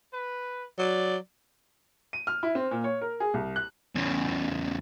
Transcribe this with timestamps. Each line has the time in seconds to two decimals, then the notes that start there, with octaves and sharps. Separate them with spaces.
0.13 B4
0.78 F#3 D5
2.13 D#7
2.27 F6
2.43 E4
2.55 C4
2.71 A#2
2.84 C#5
3.02 A#4
3.20 G#4
3.34 C2
3.56 F#6
3.96 E2 C#3